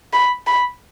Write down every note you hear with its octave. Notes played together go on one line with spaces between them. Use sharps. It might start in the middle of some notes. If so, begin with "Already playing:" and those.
B5
B5